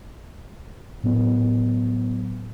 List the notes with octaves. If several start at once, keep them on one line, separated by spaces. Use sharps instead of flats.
A2 F#3 B3